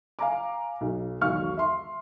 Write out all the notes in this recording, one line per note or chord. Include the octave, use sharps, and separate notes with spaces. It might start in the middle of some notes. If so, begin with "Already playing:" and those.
F5 G#5 A#5 D6
B1
E1 B1 D#3 F5 C#6 F6
E5 C6